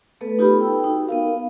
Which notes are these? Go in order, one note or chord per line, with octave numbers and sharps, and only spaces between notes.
A3 B3 A4 B4
D#4 F4 G4 A4 B5
A4 G5 E6
D#4 F#4
B3 A#4 F5